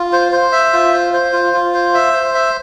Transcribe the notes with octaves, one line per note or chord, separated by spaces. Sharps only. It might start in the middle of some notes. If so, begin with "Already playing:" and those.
Already playing: F4
C5
C5
E5
F4
C5
C5
F4
F4
C5
E5
C5
E5